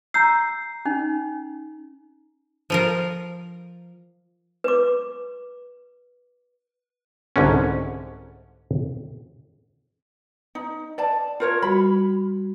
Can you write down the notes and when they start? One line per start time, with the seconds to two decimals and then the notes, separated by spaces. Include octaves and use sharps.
0.14 A#5 E6 G6 C7
0.85 C#4 D#4
2.70 F3 F4 A#4
4.64 B4 D6
7.36 C2 G#2 D3 C#4
10.55 D#4
10.98 D5 A5
11.40 F4 A#4 C#5 G6
11.62 G3 F#4 B5